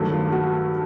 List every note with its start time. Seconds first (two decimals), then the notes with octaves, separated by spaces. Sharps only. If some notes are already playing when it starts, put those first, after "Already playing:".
Already playing: G2 D#3 F#3 A3
0.12 F4
0.32 F#4